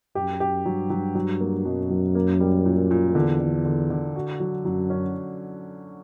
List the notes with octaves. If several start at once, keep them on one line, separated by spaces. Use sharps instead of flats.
F#2 G4
G4
G2 F#3
F#3
F#3
A#3
F#2 B2
F#3
A#3
G3
A#2
A#2
E2 D3
D3
D3
D3
F#4
F#3
F#2 F#3
C#4